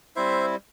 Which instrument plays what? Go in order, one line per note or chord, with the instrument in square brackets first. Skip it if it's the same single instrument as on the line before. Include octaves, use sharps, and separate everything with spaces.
[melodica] G3 C4 E4 C5 E5